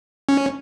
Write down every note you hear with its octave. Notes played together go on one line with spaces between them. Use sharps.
C#4